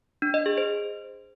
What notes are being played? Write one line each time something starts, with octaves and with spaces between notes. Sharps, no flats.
D4
D#5
G#4
C5